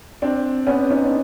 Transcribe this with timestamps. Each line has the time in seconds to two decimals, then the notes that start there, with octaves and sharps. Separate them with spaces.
0.22 C4 D4
0.67 B3 C#4
0.90 C#4 D#4
1.07 D4